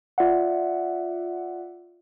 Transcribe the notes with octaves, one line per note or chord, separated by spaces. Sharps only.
F4 D5 E5 F#5